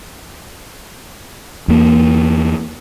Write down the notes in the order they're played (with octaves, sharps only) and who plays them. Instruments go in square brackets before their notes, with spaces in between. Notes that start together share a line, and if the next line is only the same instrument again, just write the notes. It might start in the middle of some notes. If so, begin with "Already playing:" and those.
[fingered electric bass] E2 A#3